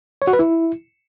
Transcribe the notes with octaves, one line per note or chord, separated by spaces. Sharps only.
C#5
F#4
B4
E4